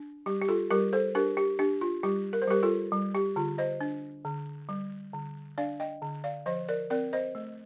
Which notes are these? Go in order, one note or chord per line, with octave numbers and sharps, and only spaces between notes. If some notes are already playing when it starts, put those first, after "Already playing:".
Already playing: D4
G3 G4
G4
F4 A4
G3 G4 A#4
A4 C5
D4 G4 A#4
G4
D4 G4
F4
G3 G4
A#4
C5
G3 G4 A#4
F4 A4
G3
G4
D3 F4
C5 D#5
D4
D3
G3
D3
D4 D5 F5
D#5 G5
D3
D5 F5
F3 C5 D#5
A#4 D5
C4 A#4 D5
C5 D#5
A3